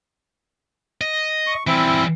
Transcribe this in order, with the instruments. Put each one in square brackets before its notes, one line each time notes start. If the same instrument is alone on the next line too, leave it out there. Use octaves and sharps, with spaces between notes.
[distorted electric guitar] D#5
[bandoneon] C#6
[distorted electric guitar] E3 G3 [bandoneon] C4 E4